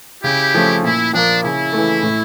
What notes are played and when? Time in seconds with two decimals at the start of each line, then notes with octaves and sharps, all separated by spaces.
0.23 C#3 E4 G4
0.54 F3 A3 C#4
0.83 A#2 E4
1.13 F3 A#3 D4
1.43 C#3 E4
1.73 E3 A3
2.03 A2